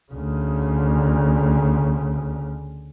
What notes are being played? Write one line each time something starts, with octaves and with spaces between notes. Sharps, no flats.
D2 C#3